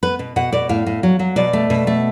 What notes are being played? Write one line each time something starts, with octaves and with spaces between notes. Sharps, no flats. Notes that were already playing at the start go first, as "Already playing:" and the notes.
B3 B4
B2
B2 F#5
B2 D5
A2 F5
A2
F#3
F#3
B2 D5
A3
B2
A3